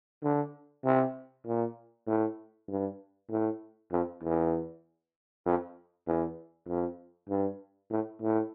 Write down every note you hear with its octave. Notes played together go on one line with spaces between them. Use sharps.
D3
C3
A#2
A2
G2
A2
F2
E2
F2
E2
F2
G2
A2
A2